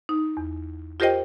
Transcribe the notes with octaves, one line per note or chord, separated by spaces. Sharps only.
D#4
E2
F4 G4 A#4 C5 D#5 G5